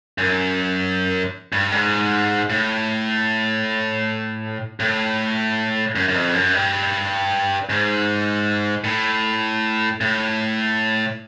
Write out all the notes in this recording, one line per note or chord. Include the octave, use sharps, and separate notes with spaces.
F#2
G2
G#2
A2
A2
F#2
F#2
F2
F#2
G2
G#2
A2
A2